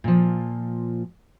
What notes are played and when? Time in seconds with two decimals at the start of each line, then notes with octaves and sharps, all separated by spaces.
0.04 A#2 F3